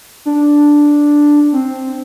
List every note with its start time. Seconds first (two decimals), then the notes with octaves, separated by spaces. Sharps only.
0.25 D4
1.53 C4